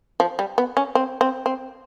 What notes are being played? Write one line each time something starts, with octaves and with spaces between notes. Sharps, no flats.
F3
G3
B3
C#4
C4
C4
C4